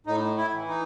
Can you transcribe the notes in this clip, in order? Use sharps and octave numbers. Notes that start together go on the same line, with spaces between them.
A2 D#4
E4
E3
D#4